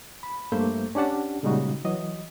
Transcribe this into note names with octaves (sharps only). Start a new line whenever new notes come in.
B5
G2 A3 A#3 C5 E5 G6
C#4 D4 G4 F#5 A5
A#2 C#3 G3 G#3 D#4 F#4
E3 F#3 D#5